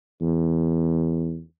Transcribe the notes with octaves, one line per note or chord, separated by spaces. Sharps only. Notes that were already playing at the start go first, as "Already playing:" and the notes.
E2